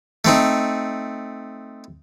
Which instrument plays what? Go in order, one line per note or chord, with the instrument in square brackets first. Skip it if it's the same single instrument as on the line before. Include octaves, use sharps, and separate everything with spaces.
[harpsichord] A3 C4 D#4